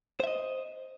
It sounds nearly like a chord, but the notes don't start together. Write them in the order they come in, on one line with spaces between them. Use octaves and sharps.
C5 E5 D#5